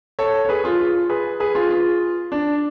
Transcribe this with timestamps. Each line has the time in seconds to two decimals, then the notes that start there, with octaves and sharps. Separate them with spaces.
0.19 A4 C#5
0.45 C#5
0.49 G#4 B4
0.64 F4 G#4
0.79 F4
1.09 G#4 B4
1.40 G#4 B4
1.55 F4 G#4
1.70 F4
2.32 D4